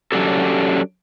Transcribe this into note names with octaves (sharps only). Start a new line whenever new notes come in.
F#3 C#4 D4 G4 A4